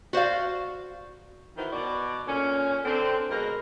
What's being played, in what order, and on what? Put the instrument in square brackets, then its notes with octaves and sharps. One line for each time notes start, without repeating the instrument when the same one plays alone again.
[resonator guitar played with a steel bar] F#4 C5 D5 F5
[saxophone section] D#3 E3 E4 F#4 C5
B2 F#4 D5
A#2 D3 C#4
D3 C4
B2 G#3 A#4